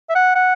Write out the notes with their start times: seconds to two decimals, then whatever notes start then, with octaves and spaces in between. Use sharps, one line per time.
0.09 E5
0.15 F#5
0.35 F#5